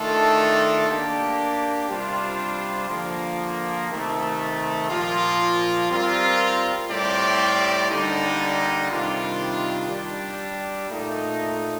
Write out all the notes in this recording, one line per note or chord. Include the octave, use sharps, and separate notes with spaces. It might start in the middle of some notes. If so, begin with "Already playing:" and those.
Already playing: D#3 A3 D4 F4 A4
A#3 D4 G4
C3 G3 D4 F4 C5
D3 F3 A#3
C3 D#3 A3
A#2 F3 A#3 F4
G3 C4 F4 A#4
A2 G3 C4 G4 D5
D3 G3 A#3 D#4
C3 D#3 G3 D4 F4
G3 D4 G4
A#2 A3 D#4